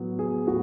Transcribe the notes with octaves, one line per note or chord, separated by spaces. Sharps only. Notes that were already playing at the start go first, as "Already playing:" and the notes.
Already playing: A2 F#3 B3
G#4
A2 F#4